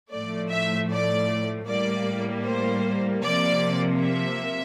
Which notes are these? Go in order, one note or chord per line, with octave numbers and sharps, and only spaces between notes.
A2 F3 A3 D5
E5
D5
A2 G3 A#3 D5
C5
C3 F3 A#3 D5
E5